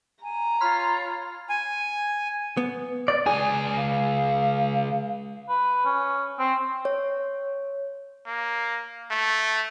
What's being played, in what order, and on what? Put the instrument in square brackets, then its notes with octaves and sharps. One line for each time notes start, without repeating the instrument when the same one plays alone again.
[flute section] G#5 [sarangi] A#5
[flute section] F4 C#5 [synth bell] B5 C6 F6
[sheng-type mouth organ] G#5
[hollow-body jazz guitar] B3
[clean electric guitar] D5
[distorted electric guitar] C#2 G#5 [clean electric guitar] G#4
[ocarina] F5
[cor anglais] B4
C#4
C4
[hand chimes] C#5
[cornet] A#3
A3